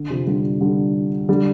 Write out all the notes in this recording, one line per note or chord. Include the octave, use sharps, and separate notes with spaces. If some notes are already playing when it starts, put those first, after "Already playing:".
Already playing: D3
C3 F3
D3 G3
D3 G3
D3 G3